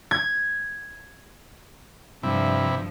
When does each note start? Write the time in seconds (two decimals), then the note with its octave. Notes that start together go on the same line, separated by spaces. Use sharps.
0.11 G#6
2.23 G2 C3 F3 E4